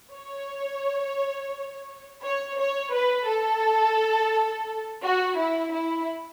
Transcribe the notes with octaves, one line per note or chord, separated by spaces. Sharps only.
C#5
C#5
C#5
B4
A4
F#4
E4
E4